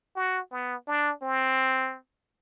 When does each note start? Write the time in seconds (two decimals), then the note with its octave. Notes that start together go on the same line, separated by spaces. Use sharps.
0.16 F#4
0.51 B3
0.87 D4
1.22 C4